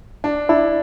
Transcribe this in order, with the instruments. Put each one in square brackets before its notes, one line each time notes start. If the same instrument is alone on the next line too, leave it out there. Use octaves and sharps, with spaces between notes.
[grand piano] D4
[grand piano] D4 [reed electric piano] E4